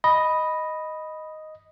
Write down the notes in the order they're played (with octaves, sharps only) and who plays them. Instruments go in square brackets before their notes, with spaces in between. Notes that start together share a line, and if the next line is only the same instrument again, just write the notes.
[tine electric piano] D#5 [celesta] B5